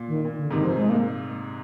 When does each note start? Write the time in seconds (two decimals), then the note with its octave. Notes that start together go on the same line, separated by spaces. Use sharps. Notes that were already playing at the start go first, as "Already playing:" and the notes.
Already playing: A#2
0.08 D#3
0.25 A#2
0.38 D3
0.51 G#2 C3 D#3
0.64 F3
0.77 G#3
0.89 A#3